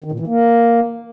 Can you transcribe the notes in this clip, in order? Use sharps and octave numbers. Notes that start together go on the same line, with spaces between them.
D#3
A#2
E3
A#3